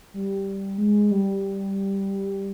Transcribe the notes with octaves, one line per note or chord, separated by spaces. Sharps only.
G3
G#3
G3